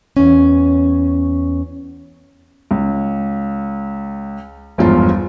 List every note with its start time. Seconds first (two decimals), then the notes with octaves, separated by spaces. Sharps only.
0.16 E2 C#4
2.71 C#2
4.78 G1 E2 G#2 F3 F4